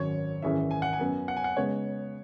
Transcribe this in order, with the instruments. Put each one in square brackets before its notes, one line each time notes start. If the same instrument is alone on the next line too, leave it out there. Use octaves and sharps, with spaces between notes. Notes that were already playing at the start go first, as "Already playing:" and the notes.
Already playing: [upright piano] G#1 F#2 F#3 C#4 [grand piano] C#5
[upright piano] G#1 F#2 E3 C#4 G#4 [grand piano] E5
[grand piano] G#5
F#5
G#5
[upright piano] F#2 F#3 B3
[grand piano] F#5
G#5
F#5
[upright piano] C#3 G#3 B3 [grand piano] C#5